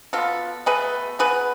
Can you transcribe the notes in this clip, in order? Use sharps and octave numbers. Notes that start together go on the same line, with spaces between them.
B2 B3 F4 A4
B2 A3 G#4 B4
B2 B3 G#4 B4